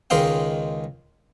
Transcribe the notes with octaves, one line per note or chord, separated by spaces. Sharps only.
C#2 D#3 G#3 D#5 F5 G5